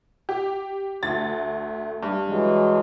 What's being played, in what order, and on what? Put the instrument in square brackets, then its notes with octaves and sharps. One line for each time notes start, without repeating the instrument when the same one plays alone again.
[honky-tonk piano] G4
[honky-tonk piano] D2 A6 [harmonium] A3
[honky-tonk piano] G2
[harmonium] E3 F#3 G#3